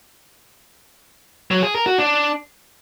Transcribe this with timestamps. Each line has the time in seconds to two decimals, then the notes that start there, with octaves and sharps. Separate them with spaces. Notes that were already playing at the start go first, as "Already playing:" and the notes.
1.51 F#3
1.63 G#4
1.74 A#4
1.86 F#4
1.98 D4